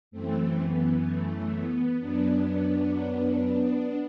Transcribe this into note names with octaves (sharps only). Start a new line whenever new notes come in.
F#2 E3 A3 C4
B3
A3
B3
F#2 F#3 B3 D4